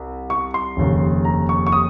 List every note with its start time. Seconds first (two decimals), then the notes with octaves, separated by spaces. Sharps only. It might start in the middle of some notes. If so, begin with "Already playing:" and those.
Already playing: C2
0.30 C#6
0.54 C6
0.77 F1 D#2 C#3
1.25 A#5
1.49 C#6
1.67 C#6
1.72 D#6